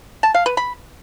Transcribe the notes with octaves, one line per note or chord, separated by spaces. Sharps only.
A5
F5
B4
B5